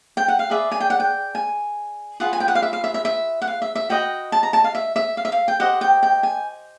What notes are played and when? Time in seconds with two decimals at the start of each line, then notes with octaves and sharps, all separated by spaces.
0.17 G5
0.28 F#5
0.39 F5
0.50 G#4 B4 D5 E5
0.72 G#5
0.80 G5
0.90 F#5
1.00 G5
1.35 G#5
2.20 F4 G#4 B4 F#5
2.33 G#5
2.40 G5
2.48 F#5
2.55 F5
2.62 E5
2.73 F5
2.84 E5
2.94 E5
3.05 E5
3.42 F#5
3.47 F5
3.62 E5
3.75 E5
3.89 F#4 B4 D#5 G5
4.32 A5
4.43 A#5
4.53 A5
4.64 F5
4.75 E5
4.96 E5
5.17 F5
5.25 E5
5.32 F5
5.48 G5
5.60 G4 C5 D#5 F#5
5.81 G5
6.03 G5
6.23 G#5